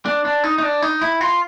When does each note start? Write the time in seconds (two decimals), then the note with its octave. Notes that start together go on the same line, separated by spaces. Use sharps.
0.05 D4
0.25 D4
0.44 D#4
0.58 D#4
0.63 D4
0.82 D#4
1.02 E4
1.21 F4